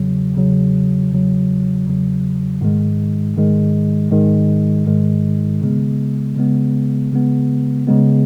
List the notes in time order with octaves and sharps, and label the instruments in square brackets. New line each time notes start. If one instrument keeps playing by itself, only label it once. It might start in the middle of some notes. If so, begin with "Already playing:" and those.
Already playing: [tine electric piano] E2 C#3 F#3
E2 C#3 F#3
E2 C#3 F#3
E2 C#3 F#3
G#2 D#3 G#3
G#2 D#3 G#3
G#2 D#3 G#3
G#2 D#3 G#3
C#3 G#3 B3
C#3 G#3 B3
C#3 G#3 B3
C#3 G#3 B3